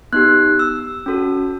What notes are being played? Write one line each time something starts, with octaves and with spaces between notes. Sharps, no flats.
B3 D#4 G4 F#6
E6
C#4 F#4 A4